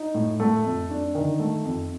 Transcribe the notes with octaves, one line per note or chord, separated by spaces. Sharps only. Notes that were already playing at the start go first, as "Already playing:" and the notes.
Already playing: D#4
A2
A3
F2
D4
D#3
A3
F2